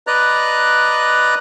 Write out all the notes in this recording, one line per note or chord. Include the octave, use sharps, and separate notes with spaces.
B4 D5 D#5 A#5 F#6